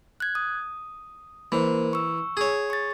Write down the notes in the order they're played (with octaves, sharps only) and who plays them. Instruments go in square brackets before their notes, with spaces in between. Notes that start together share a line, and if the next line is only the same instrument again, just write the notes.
[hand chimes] F#6 G#6
D#6
[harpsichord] E3 [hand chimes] A#3 A#4 C5
[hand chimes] C#6 E6
[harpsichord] G#4 C#5
[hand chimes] C#6 A6